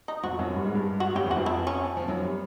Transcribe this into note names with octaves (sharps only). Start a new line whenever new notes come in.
D#4
F2 F3 F#4
F#2 F#3
G2 G3
G#2 G#3
G2 G3
F#4
G3
F#2 F#3 G4
E2 E3
F#4
F2 F3
E4
C#4
F3
F#2 F#3
G3